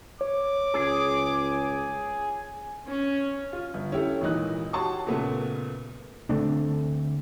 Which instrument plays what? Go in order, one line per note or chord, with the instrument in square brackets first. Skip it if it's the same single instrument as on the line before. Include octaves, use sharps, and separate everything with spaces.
[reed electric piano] C#5 [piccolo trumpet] D6
[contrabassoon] C#2 [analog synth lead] G#4
[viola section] C#4
[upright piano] F4
G1
C#4 E4 G4 A4
G#1 A#2 E3 D#4 F#6
F#4 G4 C#5 A5 C6 C#6
A#2 C#3 A3 B3
[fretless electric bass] D3 A3 C4 D4